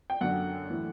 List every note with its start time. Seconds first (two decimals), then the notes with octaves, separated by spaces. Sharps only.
0.10 G5
0.21 F#2 D3 F#3 F#5
0.69 A2 E3 A3